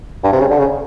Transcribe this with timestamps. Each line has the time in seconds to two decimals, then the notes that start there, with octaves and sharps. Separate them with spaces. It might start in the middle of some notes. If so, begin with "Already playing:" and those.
0.24 G2
0.33 C3
0.41 C#3
0.50 D3
0.59 C#3